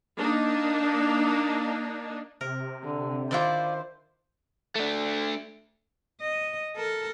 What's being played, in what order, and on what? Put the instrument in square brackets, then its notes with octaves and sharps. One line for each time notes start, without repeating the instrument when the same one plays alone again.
[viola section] A#3 D4 D#4
[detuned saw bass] C3 [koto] A#4
[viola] D3
[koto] D#3 D4 E4 [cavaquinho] F4 D5 [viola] C5
[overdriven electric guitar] A3 D4
[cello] D#5
A4 A#4